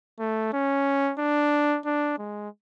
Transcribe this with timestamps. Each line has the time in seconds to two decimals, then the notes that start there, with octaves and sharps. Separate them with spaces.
0.19 A3
0.53 C#4
1.18 D4
1.85 D4
2.19 G#3